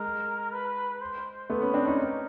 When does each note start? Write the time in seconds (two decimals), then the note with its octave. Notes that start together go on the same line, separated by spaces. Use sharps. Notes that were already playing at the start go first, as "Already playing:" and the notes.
Already playing: G#3 A#4
0.52 B4
1.01 C5
1.50 A3 B3 B4
1.62 B3 C#4
1.74 C4 D4
1.85 C#4 D#4
1.98 A#4